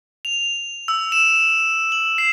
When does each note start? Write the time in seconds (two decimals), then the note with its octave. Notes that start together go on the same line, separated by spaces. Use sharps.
0.25 F7
0.88 E6
1.12 E7
1.92 F#7
2.18 C7